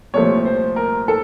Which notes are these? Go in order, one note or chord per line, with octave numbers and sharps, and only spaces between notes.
C2 A#2 F3 A3 C#5
C5
A#4
A4